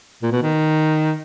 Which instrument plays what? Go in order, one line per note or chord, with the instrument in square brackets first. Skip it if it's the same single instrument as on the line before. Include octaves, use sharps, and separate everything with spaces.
[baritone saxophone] A#2
B2
D#3